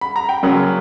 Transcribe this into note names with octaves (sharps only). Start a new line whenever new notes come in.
B5
A#5
G5
F#2 C#3 F#3 A#3 C#4 F#5